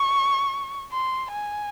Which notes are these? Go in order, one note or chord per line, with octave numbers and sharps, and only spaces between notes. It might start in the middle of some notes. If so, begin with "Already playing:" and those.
Already playing: C#6
C6
G#5